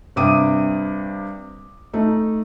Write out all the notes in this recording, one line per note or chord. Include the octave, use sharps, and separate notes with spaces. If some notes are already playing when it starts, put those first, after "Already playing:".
G2 C3 D6 D#6 D#7
A3 D#4